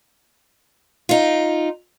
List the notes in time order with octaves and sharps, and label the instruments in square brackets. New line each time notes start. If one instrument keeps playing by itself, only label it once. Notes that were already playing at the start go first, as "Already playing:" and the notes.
[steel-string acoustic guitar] D#4 F4